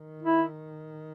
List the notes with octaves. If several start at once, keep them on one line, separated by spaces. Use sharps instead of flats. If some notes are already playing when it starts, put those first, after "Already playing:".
Already playing: D#3
E4